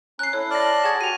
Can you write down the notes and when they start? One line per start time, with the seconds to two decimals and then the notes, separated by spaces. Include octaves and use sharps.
0.19 C#4 A#5 F#6 C7
0.33 E4 A4 C#5
0.51 D5 A5 F6 F#6 A#6
0.84 G#4 F#5 C#6 G#6 E7
1.01 F#4 G4 C#6 D#7 F7